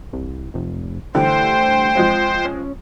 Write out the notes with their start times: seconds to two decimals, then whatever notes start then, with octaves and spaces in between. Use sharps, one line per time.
0.13 C2
0.54 F1
1.15 D3 E3 G3 A3 C5 G5
1.95 F3 G#3 C4
2.45 C#4